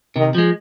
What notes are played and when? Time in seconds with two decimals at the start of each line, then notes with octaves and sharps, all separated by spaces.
0.16 C3 D#3
0.35 F3 G#3